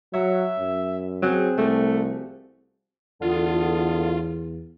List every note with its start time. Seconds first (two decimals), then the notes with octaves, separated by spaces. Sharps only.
0.14 F#3 C#5 E5 F#5
0.58 F#2
1.22 F#3 C4 G#4 C5
1.58 C2 F3 A3 F#4 D5
3.22 E2 A2 D3 B3 F4